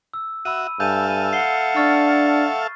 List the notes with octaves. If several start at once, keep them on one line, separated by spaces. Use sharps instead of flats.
E6
F#4 E5 B5 E6 D#7
G2 A4 E5 F5 G#5 G6 D#7
F#5 C7 G7
D4 C#6 F6 A6